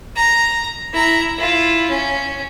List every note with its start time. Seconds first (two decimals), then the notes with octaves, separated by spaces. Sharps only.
0.16 A#5
0.93 E4 A#5
1.37 E4 F4
1.89 C#4